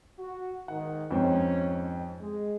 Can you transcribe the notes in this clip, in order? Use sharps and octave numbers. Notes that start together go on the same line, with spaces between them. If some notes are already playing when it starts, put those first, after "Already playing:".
F#4
G#2 D#3 F#5
F2 G#2 C4 C#4
G#3